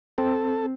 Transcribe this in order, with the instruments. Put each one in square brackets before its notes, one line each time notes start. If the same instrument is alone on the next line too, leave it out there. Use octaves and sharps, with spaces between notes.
[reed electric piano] C4 [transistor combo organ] A4